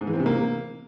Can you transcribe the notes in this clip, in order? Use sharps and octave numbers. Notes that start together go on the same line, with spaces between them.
G#2
E3
C4
C3
A#3